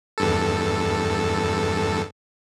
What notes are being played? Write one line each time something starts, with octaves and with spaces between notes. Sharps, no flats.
E2 G2 A4